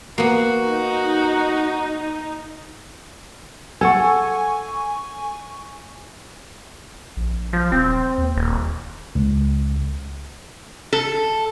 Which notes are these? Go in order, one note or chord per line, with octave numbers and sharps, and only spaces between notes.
A#3 B3 F#4
D#4
A4 F#5 G#5 C#6
A#1
F3
D#1 C4
D#2
D#1
C#2
A4